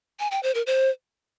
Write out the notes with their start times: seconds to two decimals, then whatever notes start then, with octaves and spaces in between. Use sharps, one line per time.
0.19 G#5
0.31 G5
0.43 C5
0.55 A#4
0.67 C5